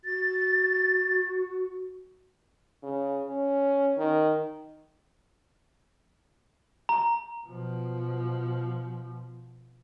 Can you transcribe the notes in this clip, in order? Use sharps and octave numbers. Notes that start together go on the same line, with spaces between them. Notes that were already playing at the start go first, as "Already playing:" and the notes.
F#4 A6
C#3
C#4
D#3
A#5
B2 F3